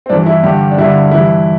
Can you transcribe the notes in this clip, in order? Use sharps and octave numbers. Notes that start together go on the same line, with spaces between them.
C4
G2 E3 D4
E4
G2 D3 G4
D4
G2 D3 E4
G2 E3 E4